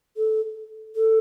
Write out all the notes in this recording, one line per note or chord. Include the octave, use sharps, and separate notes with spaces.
A4
A4